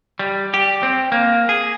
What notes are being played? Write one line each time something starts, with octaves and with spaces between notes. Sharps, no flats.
G3
G4
C4
A#3
G#4